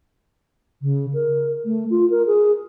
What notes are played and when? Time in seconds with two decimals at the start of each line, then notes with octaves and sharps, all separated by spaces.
0.82 C#3
1.14 A#4
1.65 A3
1.90 F4
2.10 A#4
2.26 G#4